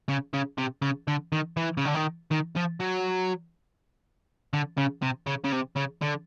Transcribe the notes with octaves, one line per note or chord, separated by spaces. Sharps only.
C#3
C#3
C3
C#3
D3
D#3
E3
C#3
D3
D#3
D#3
F3
F#3
D3
C#3
C3
C#3
C#3
C3
C#3
D3